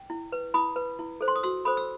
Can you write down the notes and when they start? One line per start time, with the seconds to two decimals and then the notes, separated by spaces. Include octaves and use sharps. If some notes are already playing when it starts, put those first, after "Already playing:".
Already playing: G5
0.10 E4
0.32 B4
0.54 E4 B5 D#6
0.76 B4
0.99 E4
1.21 A4 C5
1.28 C6
1.36 D#6
1.43 F#4 C6 E6
1.65 A4 C5 B5 D#6
1.77 E6